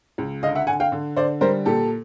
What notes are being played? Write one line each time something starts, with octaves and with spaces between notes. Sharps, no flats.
C#2
D3 D#5 F5
E5 F#5
D3 F#5 G#5
F5 G5
D3
D3 C5 D5
G3 A#4 C5
A#2 G4 A4